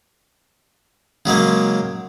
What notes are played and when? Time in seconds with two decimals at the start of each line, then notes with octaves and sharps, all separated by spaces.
1.26 C#3 F#3 G#3 A#3